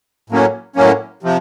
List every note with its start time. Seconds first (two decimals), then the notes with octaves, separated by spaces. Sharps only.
0.30 A2 F#3 A#3 C#4
0.76 A2 F#3 A#3 C#4
1.23 C3 F3